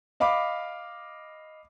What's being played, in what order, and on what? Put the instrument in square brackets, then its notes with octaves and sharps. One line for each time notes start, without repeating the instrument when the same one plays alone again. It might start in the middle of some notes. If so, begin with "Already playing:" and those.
[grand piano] D#5 F5 B5 D6